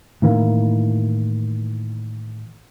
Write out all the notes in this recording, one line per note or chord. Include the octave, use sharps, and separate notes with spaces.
A2 D#3 E3 A#3